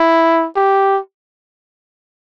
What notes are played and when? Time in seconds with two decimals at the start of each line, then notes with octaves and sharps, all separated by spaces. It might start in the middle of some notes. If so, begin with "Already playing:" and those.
Already playing: E4
0.56 G4